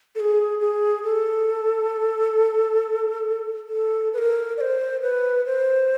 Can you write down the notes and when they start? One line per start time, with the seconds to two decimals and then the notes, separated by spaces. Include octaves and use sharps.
0.15 A4
0.20 G#4
0.60 G#4
1.03 A4
3.69 A4
4.13 B4
4.18 A#4
4.57 D5
4.61 C5
5.01 B4
5.46 C5